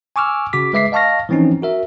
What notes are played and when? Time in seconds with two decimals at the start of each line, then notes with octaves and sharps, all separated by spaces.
0.16 G#5 C#6 D6 E6 F6
0.53 C#3 F#4 D6 B6
0.73 G#3 B4 E5 D6 B6 C7
0.92 D#5 F5 A5 C#6 F6 A#6
1.29 E3 F3 C4 C#4 D#4
1.62 F#4 A#4 E5